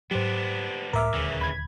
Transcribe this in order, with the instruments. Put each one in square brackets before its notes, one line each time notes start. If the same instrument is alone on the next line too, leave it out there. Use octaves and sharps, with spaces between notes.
[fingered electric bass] G#2 F#3 [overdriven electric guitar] B3 D4 [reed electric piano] G4 C5
[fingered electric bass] C#2 A2 [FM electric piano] A#4 E5 [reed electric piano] A#5 D6 F6
[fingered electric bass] D#1 D2 [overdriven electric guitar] C#3 E3
[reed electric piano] D#2 [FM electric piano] B5 G#6